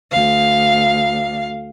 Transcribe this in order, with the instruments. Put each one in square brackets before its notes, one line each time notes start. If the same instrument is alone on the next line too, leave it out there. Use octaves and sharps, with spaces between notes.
[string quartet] D2 F5